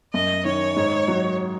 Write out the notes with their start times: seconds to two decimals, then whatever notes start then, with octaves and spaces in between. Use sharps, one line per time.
0.14 F#2 D#5
0.45 D#3 C#5
0.76 G#2
1.08 F#3